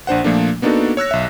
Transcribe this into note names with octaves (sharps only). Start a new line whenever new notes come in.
A#1 D4 C5 F#5
A#2 F3 A3 A#3 D4
A#3 B3 D4 D#4 F#4 A4
C#5 E6 F#6 A#6
B1 E5